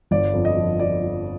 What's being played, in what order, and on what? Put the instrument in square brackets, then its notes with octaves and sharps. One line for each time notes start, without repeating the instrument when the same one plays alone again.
[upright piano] G1 D5
F2
D#5
F3
F3 D5
F3